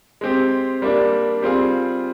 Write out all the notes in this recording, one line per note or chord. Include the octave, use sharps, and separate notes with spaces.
G#3 C4 G4
G3 A#3 D4
G3 C4 F4 G#4